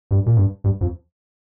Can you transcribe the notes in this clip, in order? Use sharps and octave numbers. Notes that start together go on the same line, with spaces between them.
G2
A#2
G2
G2
F2